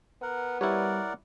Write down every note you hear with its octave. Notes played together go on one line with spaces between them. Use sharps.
B3 A#4 F#5
G3 E4 A#4 C#5 D5 F#5